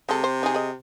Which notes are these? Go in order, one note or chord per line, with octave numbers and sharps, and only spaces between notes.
C3 G#3 A4
C5
D#4 G#4
G#4 D#5